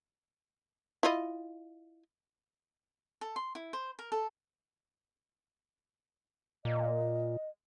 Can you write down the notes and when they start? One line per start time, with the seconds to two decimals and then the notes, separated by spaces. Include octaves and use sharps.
1.03 E4 F4 D#5
3.21 A4
3.36 C6
3.55 E4
3.73 C5
3.99 A#4
4.12 A4
6.65 A#2 D#5